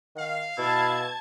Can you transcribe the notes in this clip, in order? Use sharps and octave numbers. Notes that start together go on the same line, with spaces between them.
D#3 F5
B2 E4 A5 G#6